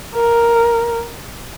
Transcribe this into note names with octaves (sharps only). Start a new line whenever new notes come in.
A#4